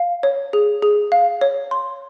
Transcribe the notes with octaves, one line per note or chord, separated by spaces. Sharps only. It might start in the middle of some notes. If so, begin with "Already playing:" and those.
Already playing: F5
C#5
G#4
G#4
F5
C#5
C6